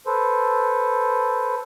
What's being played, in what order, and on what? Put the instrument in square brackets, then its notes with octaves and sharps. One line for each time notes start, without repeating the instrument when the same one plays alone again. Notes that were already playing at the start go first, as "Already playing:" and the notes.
[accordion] A4 B4 C5